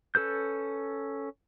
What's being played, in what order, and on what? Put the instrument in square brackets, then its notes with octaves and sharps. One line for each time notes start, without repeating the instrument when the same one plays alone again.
[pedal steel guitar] C#4 A4 B4 G6